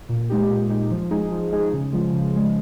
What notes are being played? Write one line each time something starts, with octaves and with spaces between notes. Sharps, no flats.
A#2
G#3 D#4 G4
A#2
G#3 D#4 G4
F3
G#3 D#4 G#4
F3
G#3 D#4 G#4
C#3
F3 G#3
C#3
F3 G#3